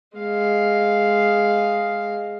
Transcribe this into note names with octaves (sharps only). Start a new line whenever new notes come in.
G#3 F5